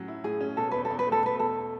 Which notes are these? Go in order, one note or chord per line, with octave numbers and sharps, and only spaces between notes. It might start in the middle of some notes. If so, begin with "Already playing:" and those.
Already playing: A2 F#3 C#4
E4
A2 G#4
C#4
B2 A4
E2 B4
A4
E2
B4
A3
A4
B2 B4
E2 A4